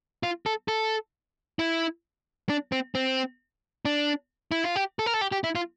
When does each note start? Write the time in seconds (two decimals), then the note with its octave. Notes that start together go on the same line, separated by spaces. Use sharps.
0.23 F4
0.46 A4
0.68 A4
1.59 E4
2.49 D4
2.72 C4
2.95 C4
3.85 D4
4.51 E4
4.64 F4
4.76 G4
4.99 A4
5.06 A#4
5.14 A4
5.21 G4
5.32 G4
5.44 E4
5.55 F4